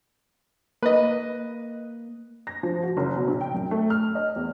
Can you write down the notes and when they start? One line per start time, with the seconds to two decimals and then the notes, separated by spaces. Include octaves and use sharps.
0.83 A#3 B4 D#5
2.47 A#6
2.63 F3
2.83 F#4
2.97 F#1
3.16 B2
3.27 A#1
3.41 G5
3.54 F#2
3.71 A3
3.90 F6
4.15 D#5
4.36 E2